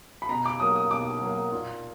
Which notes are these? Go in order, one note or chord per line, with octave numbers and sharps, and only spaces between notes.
B5
B2 A#5
D6
F#3 A#3 D#6
D#6
B2 D6
F#3 A#3
A#2